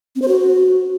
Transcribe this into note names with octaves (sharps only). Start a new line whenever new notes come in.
C4
C5
F#4